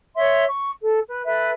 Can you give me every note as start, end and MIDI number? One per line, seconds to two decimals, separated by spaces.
0.15 0.44 73
0.15 0.44 76
0.15 0.44 84
0.46 0.69 85
0.82 0.99 69
1.07 1.24 71
1.24 1.51 69
1.24 1.51 71
1.24 1.51 76